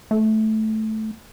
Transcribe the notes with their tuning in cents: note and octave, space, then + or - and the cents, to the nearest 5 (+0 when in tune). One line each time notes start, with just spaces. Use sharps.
A3 -10